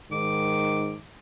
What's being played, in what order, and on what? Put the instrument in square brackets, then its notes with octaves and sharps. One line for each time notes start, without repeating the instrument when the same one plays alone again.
[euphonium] G#2 [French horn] D#3 [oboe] D6